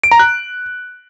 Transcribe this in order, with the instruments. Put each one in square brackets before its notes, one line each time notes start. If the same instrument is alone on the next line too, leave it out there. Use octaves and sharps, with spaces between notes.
[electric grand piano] D7
A#5
F#6